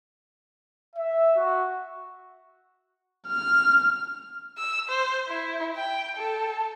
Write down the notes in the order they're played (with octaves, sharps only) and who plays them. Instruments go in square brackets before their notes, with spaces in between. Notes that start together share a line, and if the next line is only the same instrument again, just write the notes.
[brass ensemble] E5
F#4
[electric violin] F6
[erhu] E6
C5
E4
G5
A4